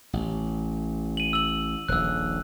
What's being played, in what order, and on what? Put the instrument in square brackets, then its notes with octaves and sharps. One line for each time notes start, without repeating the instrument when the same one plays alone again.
[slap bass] A1
[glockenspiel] D#7 F#7
E6 F#7
[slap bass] D#1 A#1 [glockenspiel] E6 F#6